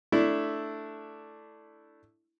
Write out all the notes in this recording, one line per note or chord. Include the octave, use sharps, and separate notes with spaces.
A3 D4 E4